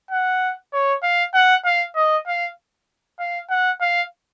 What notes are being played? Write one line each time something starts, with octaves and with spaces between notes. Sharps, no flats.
F#5
C#5
F5
F#5
F5
D#5
F5
F5
F#5
F5